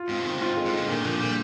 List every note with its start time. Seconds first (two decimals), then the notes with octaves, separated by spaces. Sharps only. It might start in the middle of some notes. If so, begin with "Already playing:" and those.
Already playing: F4
0.09 G#2 C4
0.25 D#3 C4
0.41 G#2 F4
0.57 G#3
0.66 G#2
0.73 A#2 D3
0.88 A#2 D#3
1.05 A#2 F3
1.20 A#2 G3